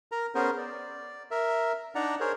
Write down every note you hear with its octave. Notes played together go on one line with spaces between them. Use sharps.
A#4 A#5
B3 C#4 G#4 A#4 C5
D5
A#4 E5
D4 D#4 D5 F#5 A#5
G#4 A#4 C5 C#5